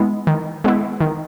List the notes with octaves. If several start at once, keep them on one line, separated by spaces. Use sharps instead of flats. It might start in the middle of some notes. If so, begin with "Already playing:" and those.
Already playing: G#3 B3 E4
D#3
G#3 B3 E4
D#3